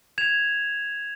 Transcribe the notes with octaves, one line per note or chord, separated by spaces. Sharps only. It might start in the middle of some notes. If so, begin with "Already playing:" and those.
G#6 E7 F7